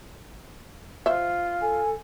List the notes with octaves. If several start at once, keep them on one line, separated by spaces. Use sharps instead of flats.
F4 C5 E5
A4 G#5